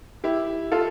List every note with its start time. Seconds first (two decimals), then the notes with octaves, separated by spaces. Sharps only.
0.24 E4 G4
0.72 F4 A4